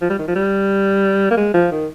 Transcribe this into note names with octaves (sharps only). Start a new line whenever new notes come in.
F3
G3
D#3
F3
G3
A#3
G#3
F3
D#3